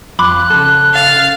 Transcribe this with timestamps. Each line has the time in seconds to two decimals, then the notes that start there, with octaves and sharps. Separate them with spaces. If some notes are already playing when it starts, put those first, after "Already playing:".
0.19 F2 B5 C6 D6 F#6
0.50 C#3 A4
0.94 F5 A6